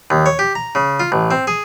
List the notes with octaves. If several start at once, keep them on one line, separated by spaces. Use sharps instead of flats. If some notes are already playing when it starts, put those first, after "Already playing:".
D#2
C#5
G4
A#5
C#3
F4
A1
C4
G#4